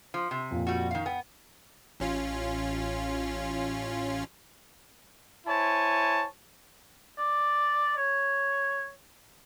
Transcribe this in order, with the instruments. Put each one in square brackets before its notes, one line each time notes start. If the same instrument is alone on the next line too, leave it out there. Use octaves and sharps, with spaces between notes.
[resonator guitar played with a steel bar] F3
C3
[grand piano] F2 A#2
[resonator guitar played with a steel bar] G3 F#4
D#3 F5
[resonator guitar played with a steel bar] B3 [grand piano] G5
[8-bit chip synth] A1 C#4 F4
[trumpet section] E4 C5 C#5 G#5 A5
[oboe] D5
C#5